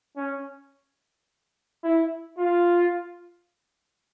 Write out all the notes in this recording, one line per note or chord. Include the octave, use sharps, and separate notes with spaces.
C#4
E4
F4